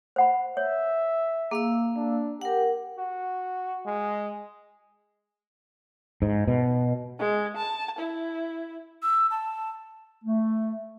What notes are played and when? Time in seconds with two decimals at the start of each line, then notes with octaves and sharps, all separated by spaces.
0.16 C5 F#5 B5
0.57 C#5 E5
1.51 A#3 G#4 F5 E6
1.96 D4
2.41 G4 A#4 F#5
2.98 F#4
3.86 G#3
6.22 G#2
6.48 B2
7.19 G#3
7.57 A5
7.98 E4
9.03 E6
9.31 A5
10.24 A3